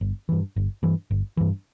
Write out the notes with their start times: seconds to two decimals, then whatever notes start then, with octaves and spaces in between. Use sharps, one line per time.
0.01 G1
0.29 G2 E3
0.56 G1
0.83 G2 E3
1.11 G1
1.37 G2 E3